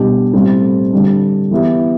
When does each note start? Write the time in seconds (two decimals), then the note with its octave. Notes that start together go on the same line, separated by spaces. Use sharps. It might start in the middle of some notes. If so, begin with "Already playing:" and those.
Already playing: B2 G3 D4 G4
0.34 A2 G3 C4
0.93 D3 G3 D4
1.51 E3 B3 E4 G4